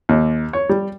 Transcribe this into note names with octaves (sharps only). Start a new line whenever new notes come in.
D#2
C#5
G3